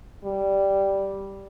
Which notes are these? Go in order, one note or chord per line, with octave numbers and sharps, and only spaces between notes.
G3